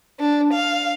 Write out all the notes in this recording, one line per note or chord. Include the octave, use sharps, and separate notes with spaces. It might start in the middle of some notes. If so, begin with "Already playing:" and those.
D4
F5